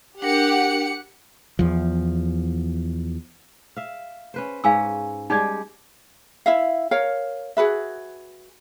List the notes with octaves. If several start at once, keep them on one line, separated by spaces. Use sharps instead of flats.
D4 G4 A#4 F#5 F#6 C#7
E2 F3
E5 F5
C#4 B4 C5
G#2 C#4 C#5 F5 G#5 E6
G3 G#3 D#4 G4 D5 D#5
E4 E5 F5
A#4 C#5 F5
F#4 G#4 B4 E5